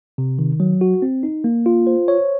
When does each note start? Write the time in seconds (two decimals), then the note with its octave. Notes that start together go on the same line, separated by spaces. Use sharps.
0.18 C3
0.39 D#3
0.60 F#3
0.81 F#4
1.02 C4
1.23 D#4
1.44 A#3
1.66 F4
1.87 C5
2.08 C#5